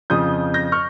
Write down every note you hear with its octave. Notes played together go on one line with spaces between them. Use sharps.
F2 C#3 F3 D#6 G6
G6 A#6
C#6 F6